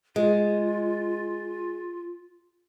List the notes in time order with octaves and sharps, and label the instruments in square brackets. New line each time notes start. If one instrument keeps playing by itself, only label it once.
[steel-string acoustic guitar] G#3 [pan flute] F4